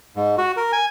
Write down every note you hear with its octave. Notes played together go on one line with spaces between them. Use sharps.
G#2
F#4
A#4
G#5